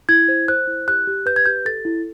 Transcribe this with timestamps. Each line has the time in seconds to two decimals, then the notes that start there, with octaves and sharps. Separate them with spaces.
0.09 E4 G#6
0.28 C5
0.48 C5 F#6
0.68 E4
0.88 G4 F#6
1.07 G4
1.26 B4 G6
1.36 G#6
1.46 G4 G6
1.65 A4 A6
1.85 E4